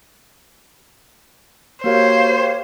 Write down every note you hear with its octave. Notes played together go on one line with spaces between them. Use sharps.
A#3 F#4 G4 A#4 C5 C#5 F5